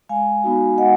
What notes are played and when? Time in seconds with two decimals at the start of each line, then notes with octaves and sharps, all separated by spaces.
0.09 G#3 F5 G#5
0.44 B3 D#4 F#4
0.78 G#3 D#5 F#5